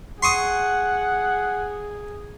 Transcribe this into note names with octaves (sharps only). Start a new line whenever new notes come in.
G#4 F#5 C6 C#6 D#6